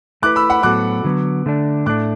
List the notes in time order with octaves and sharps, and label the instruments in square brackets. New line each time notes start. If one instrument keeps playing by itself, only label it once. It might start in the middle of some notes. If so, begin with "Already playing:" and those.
[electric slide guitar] A3 E4 B4 [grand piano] D6 F#6
[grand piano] B5 E6
F#5 B5
[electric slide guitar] A2 F#3 B3 F#4 A4 [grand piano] D6 F#6
[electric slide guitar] D3 F#3 B3
D3 A3 D4
[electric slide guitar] A2 A3 D4 [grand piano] D6 F#6